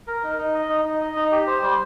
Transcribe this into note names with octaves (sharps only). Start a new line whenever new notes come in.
A#4
D#4
D#4
D#5
D#4
D#4
D#5
D#4
G4
C5
G3